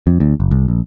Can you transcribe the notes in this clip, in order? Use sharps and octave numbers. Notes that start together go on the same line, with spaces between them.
F2
D2
F#1
C2
A#1